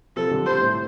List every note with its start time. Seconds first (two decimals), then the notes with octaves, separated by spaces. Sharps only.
0.16 C3 F3 A4
0.31 D3 G3
0.46 G3 C4 C5
0.61 A2